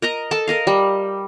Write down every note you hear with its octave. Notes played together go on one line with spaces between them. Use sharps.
A#4 D#5 A#5
A4 A5
A#4 D#5 F5
G3